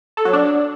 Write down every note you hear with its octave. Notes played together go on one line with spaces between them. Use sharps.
A4
F#3
D4